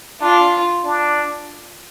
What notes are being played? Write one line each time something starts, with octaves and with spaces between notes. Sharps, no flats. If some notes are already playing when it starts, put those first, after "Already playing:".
D4 F4
D4